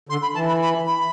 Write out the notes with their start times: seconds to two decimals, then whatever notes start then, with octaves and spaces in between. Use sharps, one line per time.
0.09 D3 C6
0.22 B5
0.34 E3 A5
0.48 B5
0.61 B5
0.87 B5